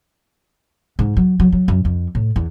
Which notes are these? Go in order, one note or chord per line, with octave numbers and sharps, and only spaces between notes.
G#2
F#3
F#3
F#3
F#2
F2
A2
E2